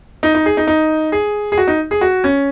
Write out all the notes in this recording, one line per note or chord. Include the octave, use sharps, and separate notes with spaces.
D#4
D#4
G#4
D#4
D#4
G#4
G#4
F#4
D#4
G#4
F#4
C#4